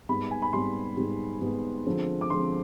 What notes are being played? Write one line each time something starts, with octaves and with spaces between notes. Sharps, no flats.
G#2 G3 B3 B5
G#5
B5
G#2 G3 B3 C6
G#2 G3 B3
G#2 G3 B3
D3 F3 G#3 C4
D6
D3 F3 G#3 C4 C6